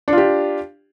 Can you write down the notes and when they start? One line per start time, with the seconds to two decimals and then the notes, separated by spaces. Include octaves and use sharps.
0.08 D4
0.13 F4
0.18 G4